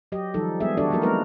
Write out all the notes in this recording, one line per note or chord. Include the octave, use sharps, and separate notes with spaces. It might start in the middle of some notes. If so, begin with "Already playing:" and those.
F#3 G4 D#5
D#3 F3 G3 D#4 A4
G3 G#3 B3 G#4 E5
D#3 D4 F#4 G4 A4 D5
F3 F#3 A#3 F#4 A#4
G#3 A#3 B3 D#4 A#4 B4